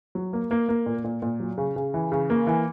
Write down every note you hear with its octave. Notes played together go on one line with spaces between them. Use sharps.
F#3
A#3
A#3
A#3
A#2
A#2
A#2
F#3
C#3
C#3
E3
C#3
A#3
E3